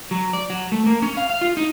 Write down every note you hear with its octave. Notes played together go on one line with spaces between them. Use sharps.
F#3
D5
F#3
A3
A#3
C#4
F5
F5
F4
D#4